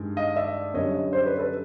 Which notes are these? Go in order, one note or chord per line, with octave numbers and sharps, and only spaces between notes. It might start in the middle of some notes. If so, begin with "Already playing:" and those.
Already playing: G2 D#3 G#3
D#5 F5
D5 E5
F#2 D3 G3 C#5 D#5
C#5 D#5
C5 D5
B4 C#5
A4 B4